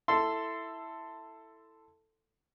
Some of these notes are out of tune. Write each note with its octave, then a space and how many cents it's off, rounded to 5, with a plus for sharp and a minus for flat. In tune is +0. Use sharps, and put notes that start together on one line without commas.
E4 +0 A4 +10 C6 -10